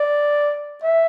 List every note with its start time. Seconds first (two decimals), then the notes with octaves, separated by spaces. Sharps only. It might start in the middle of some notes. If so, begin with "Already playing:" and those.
Already playing: D5
0.83 E5